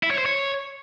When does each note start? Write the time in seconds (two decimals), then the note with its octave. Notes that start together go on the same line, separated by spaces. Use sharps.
0.03 E4
0.11 C#5
0.18 C5
0.26 C#5